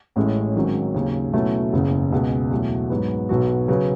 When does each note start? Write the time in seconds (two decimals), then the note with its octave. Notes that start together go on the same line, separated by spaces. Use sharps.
0.16 A1 A2 G#3 C#4
0.55 G#1 G#2 D#3 F#3 C#4
0.94 D#2 C#3 F#3
1.33 B2 F#3 A3 C#4 E4
1.73 F#1 E2 C#3
2.12 C#2 B2 G#3
2.51 E2 B2 F#3 A3
2.90 G#2 F#3 B3
3.29 B1 B2 F#3 B3 F#4
3.68 C#3 F#3 B3 F#4 B4